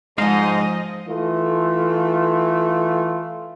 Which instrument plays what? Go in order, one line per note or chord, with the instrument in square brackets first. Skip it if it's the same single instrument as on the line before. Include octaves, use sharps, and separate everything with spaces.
[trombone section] G#2 [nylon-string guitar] F3 G#3 [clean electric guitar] D#4 C5 F5 [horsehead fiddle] D#5
[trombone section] E3 A3 F4